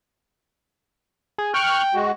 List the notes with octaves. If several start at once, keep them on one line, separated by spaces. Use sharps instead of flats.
G#4
G5 C#6 F6 F#6
G#3 F#4